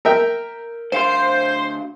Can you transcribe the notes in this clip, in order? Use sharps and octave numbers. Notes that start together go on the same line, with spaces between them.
A#4 E5 G5
D2 C5 F5 C6